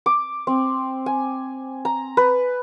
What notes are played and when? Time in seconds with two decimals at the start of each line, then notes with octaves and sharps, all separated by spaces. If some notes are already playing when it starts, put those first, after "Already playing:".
0.06 D6
0.47 C4
1.06 G#5
1.85 A#5
2.17 B4